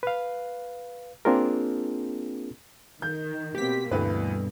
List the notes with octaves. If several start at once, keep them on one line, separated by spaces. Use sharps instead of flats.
B4 F5
A#3 C4 D4 F4 G#4 A#4
D#3 G6
B2 A#3 C4 G4 B6
D2 G2 B2 E3 B4